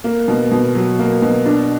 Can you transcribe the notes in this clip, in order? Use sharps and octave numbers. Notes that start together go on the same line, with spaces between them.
A#3
B2
B2
F#3
A#3
B2
D4